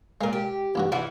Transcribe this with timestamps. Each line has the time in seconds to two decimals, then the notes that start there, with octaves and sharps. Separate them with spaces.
0.21 A#2 G#3 A#4 F5
0.33 G4
0.75 A1 G2 F#4
0.92 E3 D4 F4 F#4